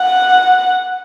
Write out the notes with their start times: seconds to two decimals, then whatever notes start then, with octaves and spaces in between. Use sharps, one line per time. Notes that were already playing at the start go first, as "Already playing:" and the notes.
Already playing: F#5